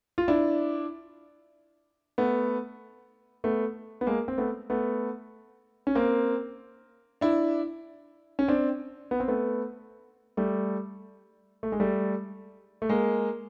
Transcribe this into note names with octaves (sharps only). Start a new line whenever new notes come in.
F4
D4 E4
A3 B3
A3 B3
B3
G#3 A#3
C4
A3 B3
A3 B3
C#4
A#3 C4
D4 E4
C#4
C4 D4
B3
C4
A3 B3
G3 A3
A3
G#3
G3 A3
A3
G#3 A#3